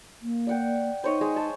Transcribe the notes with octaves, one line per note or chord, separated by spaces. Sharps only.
A#3
D5 F#5 G5
D#4 C5 C#5 D#5
G#3 G#4 D#5
G#5 A5 E6